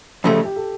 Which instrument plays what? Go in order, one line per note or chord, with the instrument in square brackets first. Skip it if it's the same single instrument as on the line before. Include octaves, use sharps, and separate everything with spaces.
[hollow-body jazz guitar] F2 C#3 F3 A3 [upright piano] G4
[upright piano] G4
G4
A4